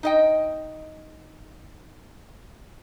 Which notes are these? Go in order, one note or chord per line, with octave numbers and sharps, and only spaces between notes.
D#4 D#5 G5